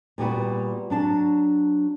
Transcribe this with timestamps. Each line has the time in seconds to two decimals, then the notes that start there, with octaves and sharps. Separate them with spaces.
0.18 A#2 G3 B3 F#4
0.90 F#3 D4 A5